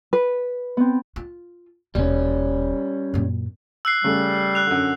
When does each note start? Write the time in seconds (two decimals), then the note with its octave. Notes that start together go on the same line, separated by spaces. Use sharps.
0.13 B4
0.77 B3 C4
1.16 F4
1.95 D#1 B2 G3 C#4
3.14 F#2 A#2
3.85 E6 F#6 C7
4.04 C#3 G3 A3
4.55 F#6 F7
4.67 F#2 D3